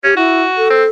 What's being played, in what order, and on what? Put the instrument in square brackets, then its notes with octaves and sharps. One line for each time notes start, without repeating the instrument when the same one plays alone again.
[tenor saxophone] C#4 [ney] G4
[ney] E4 [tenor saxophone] F#4
[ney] A4
[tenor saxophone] C4